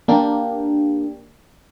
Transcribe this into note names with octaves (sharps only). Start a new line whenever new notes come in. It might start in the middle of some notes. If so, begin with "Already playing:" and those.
A#3 D4 G4